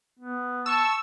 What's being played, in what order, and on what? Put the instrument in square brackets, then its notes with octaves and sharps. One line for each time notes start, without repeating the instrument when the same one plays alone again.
[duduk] B3
[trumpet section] A5 C#6 [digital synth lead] E6